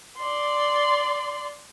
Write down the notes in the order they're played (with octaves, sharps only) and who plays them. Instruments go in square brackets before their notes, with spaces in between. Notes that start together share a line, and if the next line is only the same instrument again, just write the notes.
[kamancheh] D5 C6